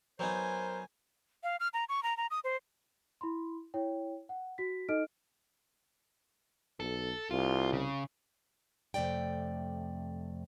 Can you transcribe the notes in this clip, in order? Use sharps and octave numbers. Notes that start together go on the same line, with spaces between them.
F#3 B3 D#4 A#4 C5 G#5
F5
F6
A#5
C#6
A#5
A#5
D#6
C5
E4 B5 C6
E4 C#5 G5
F#5
F#4 B6
D#4 A4 D#5 F6 D7
B1 A4
C2 F4
C#3
F2 C3 A3 D5 G5